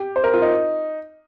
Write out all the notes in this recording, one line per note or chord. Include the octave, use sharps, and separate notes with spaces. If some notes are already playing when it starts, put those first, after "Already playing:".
Already playing: G4
C5
A#4
F4
D#4